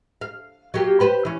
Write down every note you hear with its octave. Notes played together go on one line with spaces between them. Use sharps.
F5
F#3 A#3 G4
G4 B4 C5
E3 C#4